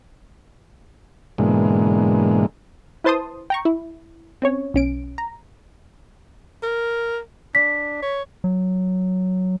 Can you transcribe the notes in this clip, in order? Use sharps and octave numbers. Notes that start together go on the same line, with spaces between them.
G#2 B2 D3 E3 G#3 A#3
E4 B4 C5 A5 C6 D#6
G5 A#5 C#6
E4
C4 C#4 C#5
B1 C#4 D7
A#5
A#4
D4 B6
C#5
F#3